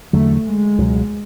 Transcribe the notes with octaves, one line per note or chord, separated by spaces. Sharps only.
E2 D3 F#3 A3
G#3
C#2 B2 F#3